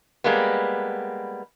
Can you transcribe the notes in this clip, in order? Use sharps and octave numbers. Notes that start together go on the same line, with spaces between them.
G3 G#3 A#3 B3